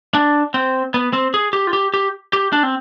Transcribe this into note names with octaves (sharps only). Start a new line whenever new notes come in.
D4
C4
B3
C4
G#4
G4
F4
G4
G4
G4
D4
C4